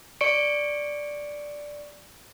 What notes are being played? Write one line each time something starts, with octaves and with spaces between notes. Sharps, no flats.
D5 C#6 C#7 D7